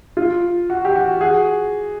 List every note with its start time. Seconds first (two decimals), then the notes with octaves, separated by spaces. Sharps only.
0.17 F4
0.70 F#4
0.85 G4
0.96 F#4
1.21 F#4 G#4